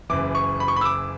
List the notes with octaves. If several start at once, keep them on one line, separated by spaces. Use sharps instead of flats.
F#1 F#2 E3 D6
C#6
B5
C#6
B5
E6
D6